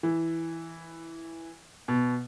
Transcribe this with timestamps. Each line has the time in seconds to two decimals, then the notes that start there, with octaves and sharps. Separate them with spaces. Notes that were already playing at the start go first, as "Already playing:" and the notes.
0.03 E3
1.88 B2